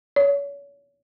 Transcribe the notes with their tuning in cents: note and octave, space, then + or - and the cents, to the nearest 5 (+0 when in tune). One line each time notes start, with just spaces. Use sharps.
C#5 +35